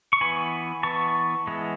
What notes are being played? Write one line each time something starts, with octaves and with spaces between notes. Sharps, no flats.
C#6
E3 B3 G#5 B5
E3 B3 A5 C#6
E3 G#3 B3